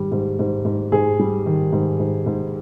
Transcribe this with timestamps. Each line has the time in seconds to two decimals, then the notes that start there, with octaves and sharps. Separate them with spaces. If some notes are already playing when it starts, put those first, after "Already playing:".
Already playing: G#2 D#3 G3
0.12 G#2
0.39 G#2
0.65 G#2
0.92 G#2 G#4
1.19 G3
1.46 D#3
1.73 G#2
2.00 G#2
2.26 G#2